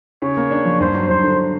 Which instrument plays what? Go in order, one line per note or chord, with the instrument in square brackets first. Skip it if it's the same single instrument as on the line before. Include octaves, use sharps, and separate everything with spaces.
[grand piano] C#3 [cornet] C#5
[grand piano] A#3
D4
F3
[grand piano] G2 [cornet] C5
[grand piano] F#3
[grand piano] G2 [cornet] C5
[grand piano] D3